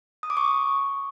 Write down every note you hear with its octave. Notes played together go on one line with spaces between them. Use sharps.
D#6
D6
C#6